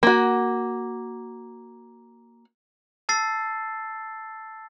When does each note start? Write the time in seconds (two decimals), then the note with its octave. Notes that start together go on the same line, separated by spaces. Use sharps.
0.03 A#3 F#4
3.09 A5 E6 A6 C7